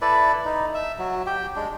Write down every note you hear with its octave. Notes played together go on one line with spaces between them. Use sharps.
E4 A4 B4 D5
D#4
E5
F#3
G4 G5
G#3 D4